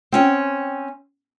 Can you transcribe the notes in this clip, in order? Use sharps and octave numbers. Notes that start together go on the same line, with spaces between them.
C4 C#4 G5